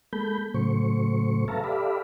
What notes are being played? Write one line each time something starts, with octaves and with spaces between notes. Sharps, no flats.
G#3 A#3 A4 B5 G6
A2 C#3 F#3 A3 C5 C#6
A4 B4 E5 F5 A5 A#5
G4 A4 D5 E5 F5 B5